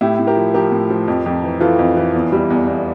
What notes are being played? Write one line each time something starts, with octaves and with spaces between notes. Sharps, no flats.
A2 E4 G4
A2
G4 A#4
F3
F3 G4 A#4
A2
F3
F2
F2
E3
E3 F4 A4
F2
E3
E2
G3
E2
E2